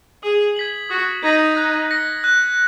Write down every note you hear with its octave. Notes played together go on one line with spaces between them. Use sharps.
G#4 D#6
G#6 B6 F#7
F#4 D#6
D#4 G#6 B6 F#7
F#6
A#6 C#7
F#6